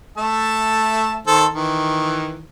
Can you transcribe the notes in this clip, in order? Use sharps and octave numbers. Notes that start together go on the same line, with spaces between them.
A3 E5 A5
D#3 A4 C5
D#3 E3